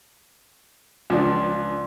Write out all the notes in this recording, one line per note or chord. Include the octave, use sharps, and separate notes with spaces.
C#2 F3 D4